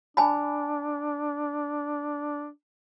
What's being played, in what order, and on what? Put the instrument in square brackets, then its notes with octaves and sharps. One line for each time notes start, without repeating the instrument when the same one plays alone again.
[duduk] D4 [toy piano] G#5 A5 B5